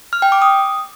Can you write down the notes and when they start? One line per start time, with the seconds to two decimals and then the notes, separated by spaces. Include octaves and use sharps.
0.13 F6
0.22 G5
0.32 D6
0.42 D#6